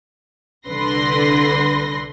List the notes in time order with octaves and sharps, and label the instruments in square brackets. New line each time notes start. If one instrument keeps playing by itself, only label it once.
[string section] C2 D3 B4 C6 A#6